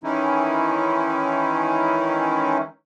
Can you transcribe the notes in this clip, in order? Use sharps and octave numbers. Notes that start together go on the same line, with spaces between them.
D#3 E3 G#3 C#4 D#4 E4